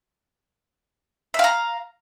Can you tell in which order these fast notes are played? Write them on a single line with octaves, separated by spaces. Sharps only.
E5 F5 A#5